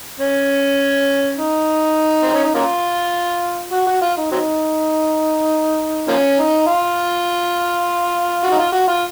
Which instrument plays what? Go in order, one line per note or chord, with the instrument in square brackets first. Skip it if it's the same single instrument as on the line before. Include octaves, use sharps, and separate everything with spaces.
[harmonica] C#4
D#4
C4
C#4
D#4
A#3 C#4 F4
F#4
F#4
F4
D#4
F#3 C4 D#4
F3 A#3 C#4
D#4
F4
F#4
D#4
F4
F#4
F4